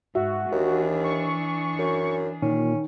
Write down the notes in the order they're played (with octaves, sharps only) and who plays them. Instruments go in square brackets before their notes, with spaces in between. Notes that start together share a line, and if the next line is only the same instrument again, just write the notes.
[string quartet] G#2 [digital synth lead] F#4 [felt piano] E5
[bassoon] D#2 [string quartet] E3 D4 G#4
[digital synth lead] C#6
[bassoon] F#2
[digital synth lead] A#2 [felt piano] D#3 [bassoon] C#4